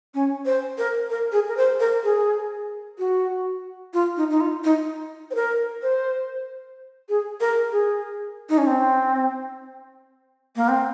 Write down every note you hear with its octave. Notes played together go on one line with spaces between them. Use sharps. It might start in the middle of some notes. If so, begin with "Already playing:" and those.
C#4
C5
A#4
A#4
G#4
A#4
C5
A#4
G#4
F#4
F4
D#4
D#4
F4
D#4
C5
A#4
C5
G#4
A#4
G#4
D#4
C#4
C4
A#3
C4